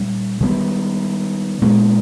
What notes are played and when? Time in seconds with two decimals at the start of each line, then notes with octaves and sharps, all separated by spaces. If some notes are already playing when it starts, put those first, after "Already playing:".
Already playing: A#2 G3 C#4
0.40 D#3 G3 B3
1.62 A#2 G#3 B3